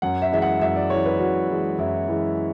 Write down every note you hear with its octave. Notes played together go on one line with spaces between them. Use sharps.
F#2 F#5
E5
E3 G#3 E5
F#5
F#2 E5
D5
E3 G#3 C#5
B4
F#2 F#4
E3 G#3
F#2 E4
E3 G#3